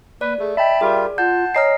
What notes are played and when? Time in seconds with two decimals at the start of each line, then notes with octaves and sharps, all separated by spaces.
0.21 A#3 B4 D5
0.40 A3 G#4
0.57 D#5 E5 G5 A5 B5
0.81 G3 F4 G#4 A#4 D5
1.18 F4 F#5 A5 G6
1.55 C#5 D#5 G#5 A#5 F6 C7